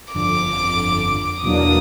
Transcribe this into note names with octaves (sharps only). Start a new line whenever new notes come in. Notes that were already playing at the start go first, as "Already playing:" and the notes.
G1 F2 D3 F3 D6
E2 B2 F#3 A#3 D4 D#6